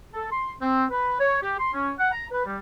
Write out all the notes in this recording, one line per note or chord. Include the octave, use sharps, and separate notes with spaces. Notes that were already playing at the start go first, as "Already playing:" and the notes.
A4
C6
C4
B4
C#5
G4
C6
C#4
F#5
A#5
B4
G3